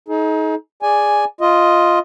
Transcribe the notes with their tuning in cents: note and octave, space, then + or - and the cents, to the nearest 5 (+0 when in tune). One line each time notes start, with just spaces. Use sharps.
D#4 +25 G#4 +45
G#4 -10 D5 +0 G#5 +0
F4 +0 D#5 +10